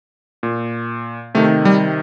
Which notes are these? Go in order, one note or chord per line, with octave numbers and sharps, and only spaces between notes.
A#2
C3 D#3 A3
G3